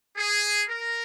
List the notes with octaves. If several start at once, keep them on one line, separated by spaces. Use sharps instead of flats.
G#4
A#4